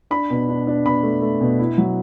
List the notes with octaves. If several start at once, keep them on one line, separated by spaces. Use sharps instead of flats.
D4 B5
B2
D4
D4
B2 B5
A3
A3
B2
E4
F#3